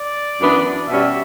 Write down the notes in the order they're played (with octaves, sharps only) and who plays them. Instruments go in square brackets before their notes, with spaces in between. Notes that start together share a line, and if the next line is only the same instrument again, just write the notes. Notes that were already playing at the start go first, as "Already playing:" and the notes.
Already playing: [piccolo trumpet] D5
[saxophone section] F#2 E3 B3 D4
[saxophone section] B2 G3 C#4 [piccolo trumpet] E5